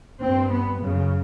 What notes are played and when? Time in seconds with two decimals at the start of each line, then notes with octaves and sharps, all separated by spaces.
0.21 G2 C4
0.49 B3
0.78 F#2 C#3